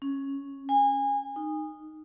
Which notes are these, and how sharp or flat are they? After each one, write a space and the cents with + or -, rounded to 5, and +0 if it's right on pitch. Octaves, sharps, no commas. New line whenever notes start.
C#4 -5
G#5 -25
D#4 -15